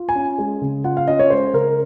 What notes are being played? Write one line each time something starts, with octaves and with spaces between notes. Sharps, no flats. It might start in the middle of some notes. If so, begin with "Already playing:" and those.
Already playing: F4
G#5
C#4
G#3
C#3
F4 F#5
F5
C#4 D#5
C#5
G#3 C5
C#3 A#4